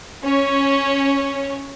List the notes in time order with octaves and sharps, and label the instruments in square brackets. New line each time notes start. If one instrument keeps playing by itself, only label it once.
[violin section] C#4 C#5